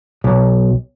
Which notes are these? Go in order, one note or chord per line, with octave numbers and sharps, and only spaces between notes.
B1